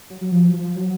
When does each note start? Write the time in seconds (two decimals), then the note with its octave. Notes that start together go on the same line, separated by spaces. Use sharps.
0.10 F#3
0.21 F#3
0.32 F3
0.53 F3
0.75 F#3